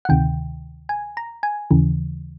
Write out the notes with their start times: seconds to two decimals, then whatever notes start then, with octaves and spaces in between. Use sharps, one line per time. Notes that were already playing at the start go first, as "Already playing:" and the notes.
0.05 F#5
0.09 D2 C3 D#3 G5
0.89 G#5
1.17 A#5
1.43 G#5
1.71 D#2 C#3 E3